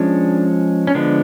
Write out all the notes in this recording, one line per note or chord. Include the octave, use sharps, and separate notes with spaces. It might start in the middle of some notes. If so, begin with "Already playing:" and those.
Already playing: F3 G#3 C#4 D4
C#4
D3 F3 G#3 B3 D4